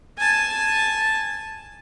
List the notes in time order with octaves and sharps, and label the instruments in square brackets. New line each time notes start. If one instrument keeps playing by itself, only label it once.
[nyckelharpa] G#5 A5